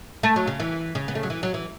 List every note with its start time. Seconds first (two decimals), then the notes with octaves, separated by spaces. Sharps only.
0.23 A3
0.36 F#3
0.47 C#3
0.60 E3
0.95 C#3
1.08 B3
1.15 A3
1.23 F#3
1.30 E3
1.43 F#3
1.54 E3